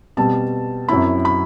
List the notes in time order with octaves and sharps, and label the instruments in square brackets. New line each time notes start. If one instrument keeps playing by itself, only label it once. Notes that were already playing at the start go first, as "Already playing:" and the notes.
[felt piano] B2 G3 C4 A5
F#2 F#3 C4 E4 B5
B5